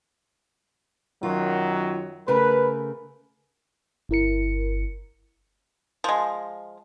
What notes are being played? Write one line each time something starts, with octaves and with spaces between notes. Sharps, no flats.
F#2 D#3 F#3 F4
C#3 A3 A#4 B4
G1 E4 A#4 C#7
F3 G#3